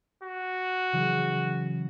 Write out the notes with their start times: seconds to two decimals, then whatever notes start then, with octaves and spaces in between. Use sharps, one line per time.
0.24 F#4
0.92 C#3 E3 F#3